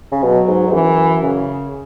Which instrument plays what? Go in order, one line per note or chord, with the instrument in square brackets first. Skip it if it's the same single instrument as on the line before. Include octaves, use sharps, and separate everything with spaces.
[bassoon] C#3
[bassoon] B2 [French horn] F#3
[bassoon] G#2
G#2
[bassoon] F#2 [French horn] E3
[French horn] C#3